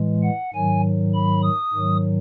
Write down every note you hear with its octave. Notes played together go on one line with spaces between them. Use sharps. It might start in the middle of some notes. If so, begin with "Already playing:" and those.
Already playing: A2 E3 G#3
F#5
G#2 D#3 F#3 G#5
B5
D#6
G#2 D#3 F#3